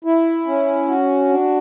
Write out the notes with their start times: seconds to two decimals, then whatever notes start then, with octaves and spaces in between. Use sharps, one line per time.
0.04 E4
0.47 C#4
0.88 F#4
1.29 D4